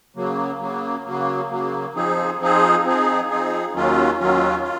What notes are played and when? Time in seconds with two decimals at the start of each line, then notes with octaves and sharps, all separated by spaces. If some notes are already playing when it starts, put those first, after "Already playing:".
0.16 C#3 F#3 A#3
0.60 C#3 F#3 A#3
1.05 C#3 F#3 A#3
1.50 C#3 F#3 A#3
1.95 F3 C4 D#4 G#4
2.39 F3 C4 D#4 G#4
2.84 F3 C4 D#4 G#4
3.30 F3 C4 D#4 G#4
3.74 D#2 D#3 F#3 C#4 F4
4.20 D#2 D#3 F#3 C#4 F4
4.63 F4